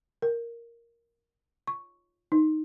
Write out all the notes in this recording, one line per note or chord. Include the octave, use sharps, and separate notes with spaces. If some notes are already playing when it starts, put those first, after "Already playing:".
A#4
C#6
D#4